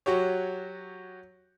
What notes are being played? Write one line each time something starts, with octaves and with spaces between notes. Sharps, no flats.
F#3 F#4 G4 C#5